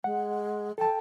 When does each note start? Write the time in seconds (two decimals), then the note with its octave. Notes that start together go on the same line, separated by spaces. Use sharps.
0.04 G#3 F#5
0.78 A4 G5 A5